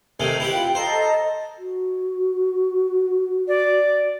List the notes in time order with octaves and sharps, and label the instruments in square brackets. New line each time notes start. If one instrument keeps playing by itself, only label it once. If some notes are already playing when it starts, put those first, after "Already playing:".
[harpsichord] C3 D#3 A3 [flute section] A4 A#4 G#6
[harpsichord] E4 G4 F#5 [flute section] B4
[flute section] F4 F5 G5
[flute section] A4 D#5 A#5 [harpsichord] C5
[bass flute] F#4
[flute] D5